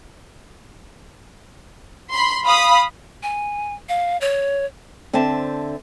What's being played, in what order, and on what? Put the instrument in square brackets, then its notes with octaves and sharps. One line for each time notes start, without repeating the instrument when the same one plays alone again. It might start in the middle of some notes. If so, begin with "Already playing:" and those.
[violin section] B5 C6
F5 B5 D#6
[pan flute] G#5
F5
C#5
[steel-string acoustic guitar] D3 C4 C5 E5 A5